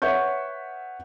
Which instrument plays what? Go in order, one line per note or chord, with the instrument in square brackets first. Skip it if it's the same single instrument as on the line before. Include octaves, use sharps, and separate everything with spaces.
[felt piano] B4 C#5 E5 F#5 C#6 G6